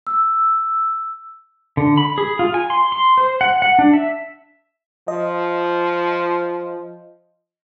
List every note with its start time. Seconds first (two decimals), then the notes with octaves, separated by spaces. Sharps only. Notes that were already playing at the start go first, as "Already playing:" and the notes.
0.07 E6
1.77 D3
1.98 B5
2.18 G#4
2.39 F4
2.54 G#5
2.70 C6
2.92 C6
3.18 C5
3.41 F#5
3.62 F#5
3.79 D4
3.93 E5
5.08 F3 D#5